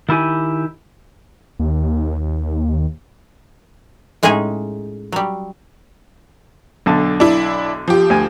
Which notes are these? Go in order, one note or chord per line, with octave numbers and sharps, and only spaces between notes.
D#3 E4 G4 G#5
D#2
A2 G#3 C#4 D#4 G#4 G#5
F#3 G3
B1 D3 A5
D4 E4
F3 G4
D2 G#5